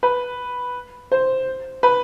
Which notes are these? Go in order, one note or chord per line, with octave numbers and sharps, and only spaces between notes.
B4
C5
B4